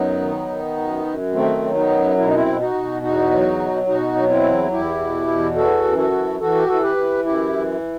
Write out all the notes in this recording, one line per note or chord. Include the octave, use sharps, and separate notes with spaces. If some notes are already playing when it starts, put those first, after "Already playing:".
Already playing: F#2 F#3 B3 D#4
D#3
D#3
F#2
F#2
D#3 A3 C4
F#3
B3 D#4
F#2
B2 E4
D#4
C4 E4
B2
D#4 F#4
B2
E2 D#4 F#4
F#3
B2
B2 D#4 F#4
F#3
C4 E4
E2
E2 E4 G4
B2
E2
E3 F#4 A4
F#2
F#4 A4
E3
E3 F#4 A4
G4
E3 A4
G4 B4
E3
F#2 E4 G4
E3